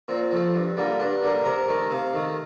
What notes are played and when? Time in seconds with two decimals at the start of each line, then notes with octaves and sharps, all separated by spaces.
0.08 A#2 C4
0.31 F3 A3
0.54 G2
0.77 D3 G3 A#3
0.99 G2 D4
1.22 D3 G3 A#3
1.45 C3 A#4
1.68 D#3 A3
1.90 C3 F5
2.13 D#3 A3